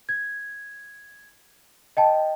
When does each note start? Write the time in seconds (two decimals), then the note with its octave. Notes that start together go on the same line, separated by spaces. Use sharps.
0.09 G#6
1.97 D#5 G5 A5